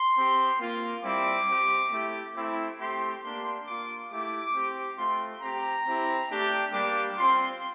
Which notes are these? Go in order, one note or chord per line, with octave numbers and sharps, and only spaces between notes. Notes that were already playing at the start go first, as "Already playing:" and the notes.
Already playing: C6
C4 G4
A#3 F4
G3 C4 E4 D6
C4 G4
A3 E4 G4
A3 C4 E4
A3 C4 G4 C6
A#3 D4 G4 C6
A#3 F4 D6
A3 E4 G4 D6
C4 G4
A3 C4 F4 C6
C4 G4 A#5
C4 E4 G4
A3 D4 G4
G3 A#3 D4 G4 D6
C4 F4 C6